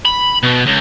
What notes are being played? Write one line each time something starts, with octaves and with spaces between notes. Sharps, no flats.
B5
B2
C#2